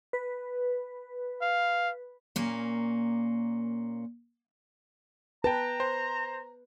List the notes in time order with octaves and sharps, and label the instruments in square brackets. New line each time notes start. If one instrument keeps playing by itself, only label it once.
[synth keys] B4
[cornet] F5
[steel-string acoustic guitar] A#2 A#3 C#4
[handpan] B4 [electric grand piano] G5 A5 [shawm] A#5
[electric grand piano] C5